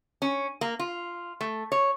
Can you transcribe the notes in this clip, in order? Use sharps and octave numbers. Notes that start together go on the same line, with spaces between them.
C#4
A#3
F4
A3
C#5